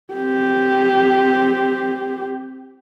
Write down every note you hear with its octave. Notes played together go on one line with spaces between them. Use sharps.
C4 G4